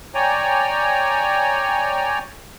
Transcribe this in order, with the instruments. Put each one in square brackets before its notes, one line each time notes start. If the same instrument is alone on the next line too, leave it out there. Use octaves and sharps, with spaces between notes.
[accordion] C#5 D5 G5 G#5 A#5